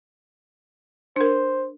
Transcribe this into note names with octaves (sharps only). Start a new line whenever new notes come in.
D4 A#4 C5